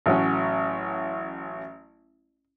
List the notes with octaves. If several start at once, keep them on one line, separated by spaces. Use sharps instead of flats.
A1 F#3 C#4